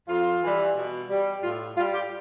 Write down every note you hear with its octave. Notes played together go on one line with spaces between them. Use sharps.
F2 F4
E3 G3
B2
G3
A2 F4
G3 F4
G4